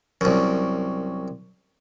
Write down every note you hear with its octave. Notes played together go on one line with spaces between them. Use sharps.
C2 F#2